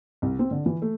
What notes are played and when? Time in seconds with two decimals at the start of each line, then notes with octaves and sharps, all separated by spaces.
0.22 C2
0.39 C4
0.51 D3
0.66 E3
0.82 A3